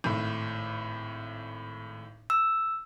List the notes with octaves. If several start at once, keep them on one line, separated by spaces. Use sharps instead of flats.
G#1 A2
E6